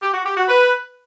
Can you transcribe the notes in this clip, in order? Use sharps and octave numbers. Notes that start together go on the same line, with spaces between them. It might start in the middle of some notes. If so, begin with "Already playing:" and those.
G4
F#4
G4
F#4
B4